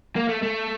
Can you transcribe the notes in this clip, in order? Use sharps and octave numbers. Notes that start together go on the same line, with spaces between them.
A#3
A3
A3